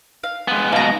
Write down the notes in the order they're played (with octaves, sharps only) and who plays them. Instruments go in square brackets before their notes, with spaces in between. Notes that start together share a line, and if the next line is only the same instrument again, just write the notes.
[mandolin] F5
[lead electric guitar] G#3 B3
[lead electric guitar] G#2 B2 [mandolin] F5 A#5